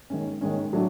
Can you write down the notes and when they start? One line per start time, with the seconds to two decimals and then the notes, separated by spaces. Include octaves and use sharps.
0.10 D#3 G#3 C#4
0.41 D#3 G#3 C#4
0.73 A2 F#3 A3 D4